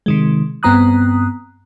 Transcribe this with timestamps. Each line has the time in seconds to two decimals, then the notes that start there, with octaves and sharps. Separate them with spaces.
0.06 C3 D#3 G#3
0.63 G2 B3 C4 A#5 D#6 F#6